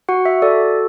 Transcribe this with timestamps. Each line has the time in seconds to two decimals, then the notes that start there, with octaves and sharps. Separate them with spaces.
0.09 F#4 F#5
0.25 E5
0.42 A4 D5